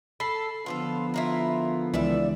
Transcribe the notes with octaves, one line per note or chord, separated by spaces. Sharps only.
A4 B5 C7
D3 F3 B3 F4 G4 A4
E4 F4 A#4
C#2 E3 G3 D5 E5